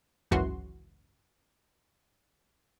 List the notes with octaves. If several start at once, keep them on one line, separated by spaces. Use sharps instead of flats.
G#1 C#2 F#2 E3 F#4 C6